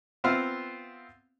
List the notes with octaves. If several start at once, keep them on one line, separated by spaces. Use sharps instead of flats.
B3 C4 F4 C5 E5 F5